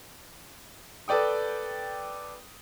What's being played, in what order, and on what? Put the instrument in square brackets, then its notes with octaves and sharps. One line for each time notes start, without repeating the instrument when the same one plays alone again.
[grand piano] A4 B4 D5 G5 D#6